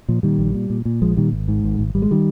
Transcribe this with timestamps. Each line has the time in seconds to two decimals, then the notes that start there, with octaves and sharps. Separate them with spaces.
0.08 A#2 F3
0.23 A#2 D#3 G3
0.39 A#1
0.54 A#2
0.70 A#2
0.85 A#2
1.02 A#1 F3 G#3
1.17 A#2 D#3 G3
1.33 G#1
1.48 G#2
1.64 G#1
1.79 G#1
1.95 G#1 G3
2.02 G#3
2.11 D#3 G3